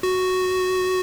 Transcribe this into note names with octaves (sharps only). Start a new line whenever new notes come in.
F#4